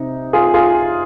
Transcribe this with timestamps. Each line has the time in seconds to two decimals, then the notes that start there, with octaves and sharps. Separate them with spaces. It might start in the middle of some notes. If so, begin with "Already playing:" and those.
Already playing: C3 D#4
0.33 F4 G#4
0.54 F4 G#4